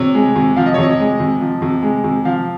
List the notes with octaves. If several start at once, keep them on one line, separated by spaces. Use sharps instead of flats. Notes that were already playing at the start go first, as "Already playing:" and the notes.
Already playing: C3 C#5
G#3
C3
F3 F5
D#5
C#5
C3 D#5
G#3
C3
F3
C3
G#3
C3
F3 F5